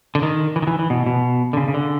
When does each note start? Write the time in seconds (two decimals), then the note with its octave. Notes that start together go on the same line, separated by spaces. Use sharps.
0.15 D3
0.22 D#3
0.56 E3
0.62 D#3
0.67 E3
0.79 E3
0.90 B2
1.06 B2
1.53 D3
1.57 C#3
1.68 C#3
1.74 D3